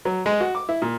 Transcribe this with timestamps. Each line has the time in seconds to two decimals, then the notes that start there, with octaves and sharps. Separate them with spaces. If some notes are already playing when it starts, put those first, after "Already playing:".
0.05 F#3
0.26 G#3
0.41 F#4
0.55 D6
0.69 E4
0.82 A#2